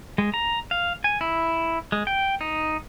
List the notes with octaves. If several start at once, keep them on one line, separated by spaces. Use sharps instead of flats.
G#3
A#5
F5
G#5
E4
G#3
G5
D#4